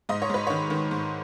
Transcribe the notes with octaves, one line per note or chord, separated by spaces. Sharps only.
G#2 D#5
C#5
G#2 B4
D#3 C#5
D#3
G#2